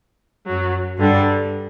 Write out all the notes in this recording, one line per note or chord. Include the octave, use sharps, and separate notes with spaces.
F#2 F#3
G2 D3 G3